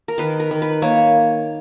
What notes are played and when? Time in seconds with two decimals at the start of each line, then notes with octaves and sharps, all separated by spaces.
0.08 A#4
0.18 D#3 B4
0.40 A#4
0.51 D#3
0.62 B4
0.82 A#3 C#5